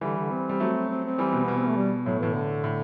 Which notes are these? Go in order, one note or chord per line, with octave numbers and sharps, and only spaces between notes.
D3 E3 G3
D3
C4
G3
F#3 A3
C4
C4
E3 G3
B2
B2 B3
C4
A3
G3
A2 F#3
A2 E3
D3
A2